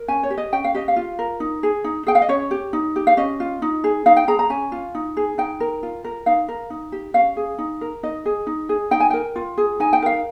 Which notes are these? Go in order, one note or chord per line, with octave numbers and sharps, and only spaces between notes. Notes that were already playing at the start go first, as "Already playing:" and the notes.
Already playing: A#4
C#4 G#5
C#5
G4
D#5
C#4 G5
F5
G4 D#5
F5
F4
A#4
D#4
G#4
D#4
G#4 G5
F5
D#5
C#4 C#5
G4
D#4
G4
F5
C#4 D#5
F4
D#4
G#4
D#4 F5
G5
G#4 A#5
A#5
C#4 G#5
F4
D#4
G#4
D#4 G5
A#4
F4
A#4
D#4 F5
A#4
D#4
G4
C#4 F5
G#4
D#4
A#4
D#4 D#5
G#4
D#4
G#4
D#4 G5
G#5
A#4 G5
F4
G#4
D#4 G#5
G5
A#4 F5